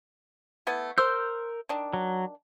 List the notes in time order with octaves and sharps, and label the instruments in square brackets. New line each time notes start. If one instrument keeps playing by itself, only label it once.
[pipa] A3 B3 E4
[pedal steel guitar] A#4 E6 G6 [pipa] C5
[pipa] D#3 D4
[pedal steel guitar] F#3